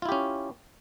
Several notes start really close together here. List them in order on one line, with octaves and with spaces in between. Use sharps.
F4 E4 G4 C#4